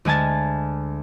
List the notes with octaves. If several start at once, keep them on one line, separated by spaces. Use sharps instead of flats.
D2 G#3 G#5 A5 A6